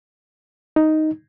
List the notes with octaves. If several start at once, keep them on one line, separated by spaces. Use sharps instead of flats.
D#4